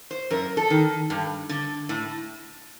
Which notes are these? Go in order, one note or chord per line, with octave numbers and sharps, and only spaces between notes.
C5
F#2 A#4
A4
D#3
G2
D3
A2